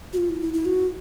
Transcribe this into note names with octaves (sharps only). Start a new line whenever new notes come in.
F#4
F4
E4
E4
E4
F#4